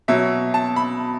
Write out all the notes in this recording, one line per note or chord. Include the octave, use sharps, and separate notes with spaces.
B2 F#3 E5
A5
B5